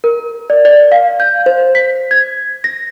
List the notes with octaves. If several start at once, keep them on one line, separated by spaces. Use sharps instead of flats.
A#4
D5
D5
F5
G6
C5
B6
G#6
A#6